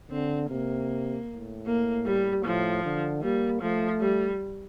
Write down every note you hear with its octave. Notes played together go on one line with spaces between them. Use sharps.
D3 C4
C3 A#3
A2
A#3
G3
A2 F3
D3
G3 A#3
F3 A3
G3